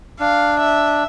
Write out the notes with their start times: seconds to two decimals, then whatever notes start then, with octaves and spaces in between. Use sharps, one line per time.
0.20 D4 F5
0.60 E5